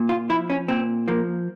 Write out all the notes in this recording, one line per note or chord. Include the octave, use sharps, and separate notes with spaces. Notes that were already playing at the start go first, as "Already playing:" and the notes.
Already playing: A#2
F4
F3 E4
C#4
A#2 C4
F3 A#3